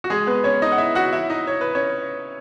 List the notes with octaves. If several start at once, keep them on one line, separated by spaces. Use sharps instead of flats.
F#4
G#3 G#4
B3 B4
C#4 C#5
D#4 D#5
F#5
E4 E5
F#4 F#5
E4 E5
D#4 D#5
C#5
B4
C#4 C#5